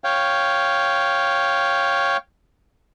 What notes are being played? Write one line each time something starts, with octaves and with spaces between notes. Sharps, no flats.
C#5 F5 G5